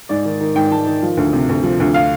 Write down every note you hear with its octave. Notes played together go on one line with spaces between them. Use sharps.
G#2 D5
D#3
D#3
G#2 G5
G#2 A5
D#3
F3
D2
C3
D2
F3
D2
F5